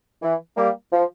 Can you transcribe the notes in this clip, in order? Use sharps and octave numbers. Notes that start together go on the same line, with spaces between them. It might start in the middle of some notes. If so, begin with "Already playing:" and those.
E3
G3 A#3
F3